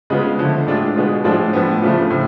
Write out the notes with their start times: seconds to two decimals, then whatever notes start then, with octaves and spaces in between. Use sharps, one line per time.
0.10 C#3 G#3 B3 F4
0.39 D3 F3 A3
0.67 A2 G#3 D4 F4
0.96 B2 G#3 B3 F4
1.24 A2 F3 G#3 D4 F4
1.53 A2 F3 B3
1.82 C#3 F3 A3 D4 F4
2.10 A2 F3